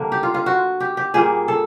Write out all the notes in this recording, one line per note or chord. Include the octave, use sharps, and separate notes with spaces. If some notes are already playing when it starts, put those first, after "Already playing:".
Already playing: D3 G3 A#3
G4
F4
F4
F#4
G4
G4
A#2 G3 A#3 G#4
A4